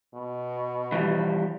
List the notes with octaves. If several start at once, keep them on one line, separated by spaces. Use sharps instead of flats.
B2
E3 F3 G3